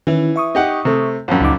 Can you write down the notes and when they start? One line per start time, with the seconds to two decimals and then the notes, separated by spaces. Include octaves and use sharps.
0.07 D#3 E3 C#4 E4
0.36 E5 C#6 D#6
0.55 D#4 G4 F#5
0.85 C3 A3
1.28 A#1 F#2
1.41 C#2 D#4 D6